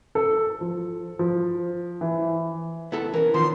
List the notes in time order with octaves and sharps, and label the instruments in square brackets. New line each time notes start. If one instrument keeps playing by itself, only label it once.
[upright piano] A4
F3
F3
E3
[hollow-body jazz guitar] B3 E4 A4
[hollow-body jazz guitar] E3 [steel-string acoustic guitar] C#4 A#4
[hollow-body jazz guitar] D#3 F3 B3 [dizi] C6